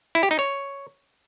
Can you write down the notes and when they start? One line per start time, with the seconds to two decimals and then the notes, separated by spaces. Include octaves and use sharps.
0.15 E4
0.23 G4
0.31 D#4
0.39 C#5